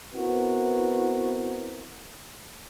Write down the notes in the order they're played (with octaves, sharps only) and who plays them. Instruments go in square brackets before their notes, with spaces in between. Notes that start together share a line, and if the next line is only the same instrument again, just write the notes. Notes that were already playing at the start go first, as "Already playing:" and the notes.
[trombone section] B3 C4 E4 F#4 A#4 B4